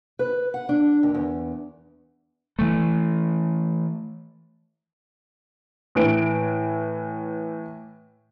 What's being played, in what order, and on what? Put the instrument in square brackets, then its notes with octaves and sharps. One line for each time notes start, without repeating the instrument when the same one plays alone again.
[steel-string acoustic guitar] B4
F#5
D4
D#2
E2
[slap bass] E3 A3
[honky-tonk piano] A2 E3 D7